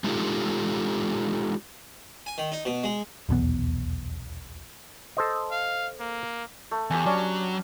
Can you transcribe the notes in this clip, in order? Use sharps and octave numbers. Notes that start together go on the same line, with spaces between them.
G#3 D4 D#4 F4 G4 A4
G#5
D#3
D#4
B2
G#3
D#1 B1 E2 B3
A4 C5 D#5
F5
A#3
A3
E2 G4 B4 G#5
F#3 G3 C#4 D4